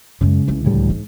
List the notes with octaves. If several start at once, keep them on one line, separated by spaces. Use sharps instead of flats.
F#2 C#3 G#3
C#2 E3
D2 A2 G3
G#2